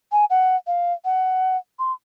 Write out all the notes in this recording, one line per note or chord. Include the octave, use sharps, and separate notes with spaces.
G#5
F#5
F5
F#5
C6